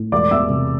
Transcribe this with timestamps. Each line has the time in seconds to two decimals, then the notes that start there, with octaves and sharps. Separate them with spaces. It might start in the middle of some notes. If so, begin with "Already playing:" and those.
Already playing: A2
0.12 E1 D5 D6
0.31 E2 E5 E6
0.50 C3